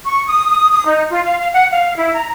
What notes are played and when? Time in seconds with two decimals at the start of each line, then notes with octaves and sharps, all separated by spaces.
0.06 C#6
0.27 D#6
0.50 D#6
0.72 D#6
0.86 D#4
1.10 F4
1.24 F5
1.38 F5
1.53 F#5
1.71 F5
1.97 E4
2.14 A#5